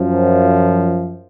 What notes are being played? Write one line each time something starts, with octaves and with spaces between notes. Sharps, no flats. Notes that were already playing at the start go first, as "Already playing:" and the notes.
Already playing: F#2 F3